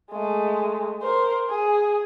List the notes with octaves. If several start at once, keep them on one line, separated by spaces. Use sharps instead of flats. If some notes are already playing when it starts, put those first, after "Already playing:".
G#3 A3
A#4 C5
G#4